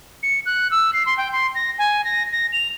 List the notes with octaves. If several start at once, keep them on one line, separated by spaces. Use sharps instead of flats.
C#7
F#6
E6
C7
C6
G5
C6
A#6
G#5
A#6
A#6
F7